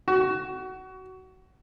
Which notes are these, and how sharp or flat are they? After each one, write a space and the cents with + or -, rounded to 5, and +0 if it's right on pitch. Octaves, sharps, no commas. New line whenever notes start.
F#4 +20